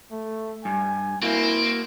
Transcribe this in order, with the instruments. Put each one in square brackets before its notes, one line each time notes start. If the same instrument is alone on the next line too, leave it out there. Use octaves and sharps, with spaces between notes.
[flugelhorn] A3
[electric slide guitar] G2 [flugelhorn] G#5
[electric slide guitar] A#3 F#4 [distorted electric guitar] C4 C5 [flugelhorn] E4